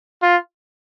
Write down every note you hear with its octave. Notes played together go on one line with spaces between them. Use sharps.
F4